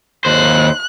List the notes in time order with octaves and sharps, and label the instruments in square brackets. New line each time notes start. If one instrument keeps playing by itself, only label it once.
[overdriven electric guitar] D#2 C5 [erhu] F#6